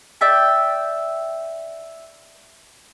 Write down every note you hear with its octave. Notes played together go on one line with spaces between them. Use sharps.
D5 E5 G5